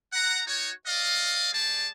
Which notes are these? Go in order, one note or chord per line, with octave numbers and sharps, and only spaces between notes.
F#5 A#5
D#4 F#4 C#5
D5 D#5 F5
G3 G#4 D5 A5